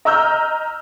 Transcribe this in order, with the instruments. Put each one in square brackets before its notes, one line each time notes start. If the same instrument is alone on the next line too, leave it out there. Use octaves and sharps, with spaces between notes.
[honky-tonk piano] D#5 A#5 E6 F6 G6